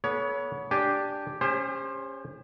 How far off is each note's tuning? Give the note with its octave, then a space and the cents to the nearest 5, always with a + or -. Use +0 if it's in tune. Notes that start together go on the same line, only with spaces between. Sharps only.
B3 -20 A4 -35 C#5 +25
D4 +0 G4 +0 G#5 +0
C#4 +0 G4 +45 C5 +15